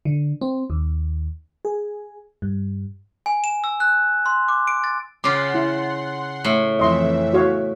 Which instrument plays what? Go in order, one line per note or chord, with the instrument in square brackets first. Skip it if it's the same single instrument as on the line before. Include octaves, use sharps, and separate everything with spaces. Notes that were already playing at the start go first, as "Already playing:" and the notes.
[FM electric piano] D3
C4
D#2
G#4
G2
[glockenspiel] G#5
E7
E6
F#6
C6
D6
D7
A6
[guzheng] C#3 F4 [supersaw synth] F#5 C6 [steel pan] D6
[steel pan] E4
[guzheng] A2
[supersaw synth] F2 E3 E5 [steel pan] D#5 C6
[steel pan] F#4 C#5 F5